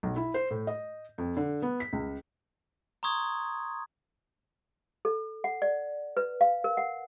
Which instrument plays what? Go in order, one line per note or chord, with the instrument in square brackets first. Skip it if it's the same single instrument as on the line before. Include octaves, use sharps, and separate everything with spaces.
[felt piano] B1
E4
C5
A2
D#5
F2
D3
B3
B6
C#2
[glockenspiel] A#5 C6 C#6 D#6 G#6
[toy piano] A4
F#5
D5
B4
F5
A#4
F#5